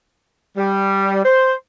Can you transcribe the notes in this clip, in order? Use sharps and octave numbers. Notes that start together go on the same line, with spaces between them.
G3
C5